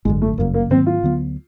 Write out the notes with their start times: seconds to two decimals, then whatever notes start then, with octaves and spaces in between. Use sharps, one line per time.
0.05 G#1 F#2 D3 G#3
0.22 A3
0.38 G1 F#2 C#3 A#3
0.54 A#3
0.70 G#2 D#3 F#3 A#3 C4
0.86 F4
1.03 D2 D3 F#3 B3